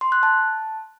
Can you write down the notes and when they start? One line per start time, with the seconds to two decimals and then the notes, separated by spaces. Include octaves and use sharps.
0.01 C6
0.12 F#6
0.23 A5